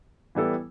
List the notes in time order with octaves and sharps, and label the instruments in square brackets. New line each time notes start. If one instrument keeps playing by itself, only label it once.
[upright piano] E3 G3 B3 E4 A4